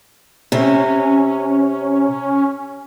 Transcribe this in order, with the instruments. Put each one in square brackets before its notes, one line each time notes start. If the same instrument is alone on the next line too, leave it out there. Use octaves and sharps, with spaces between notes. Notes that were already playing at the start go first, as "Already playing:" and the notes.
[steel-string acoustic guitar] C3 [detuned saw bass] C#4